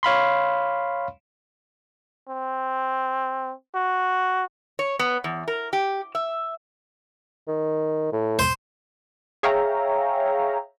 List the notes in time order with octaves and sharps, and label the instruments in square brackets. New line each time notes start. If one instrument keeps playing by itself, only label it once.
[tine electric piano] C#5 F5 B5 C6
[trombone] C4
F#4
[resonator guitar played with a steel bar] C#5
B3
E2
A#4
G4
E5
[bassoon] D#3
A2
[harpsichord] C5
[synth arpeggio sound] G#4 C#5 E5 F5 G5 A#5